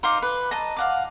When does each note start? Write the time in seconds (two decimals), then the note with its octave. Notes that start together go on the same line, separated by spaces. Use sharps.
0.03 D#4 C5 F5 D6
0.22 B4
0.51 D#5 A5 A#5
0.76 F5 F#5 D6